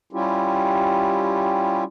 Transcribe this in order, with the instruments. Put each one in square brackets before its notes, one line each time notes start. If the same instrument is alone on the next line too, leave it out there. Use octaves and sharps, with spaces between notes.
[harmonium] G3 C#4 E4 F4 G4